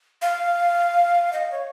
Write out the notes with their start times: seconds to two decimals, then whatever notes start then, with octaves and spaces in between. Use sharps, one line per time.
0.22 F5
1.33 D#5
1.51 C#5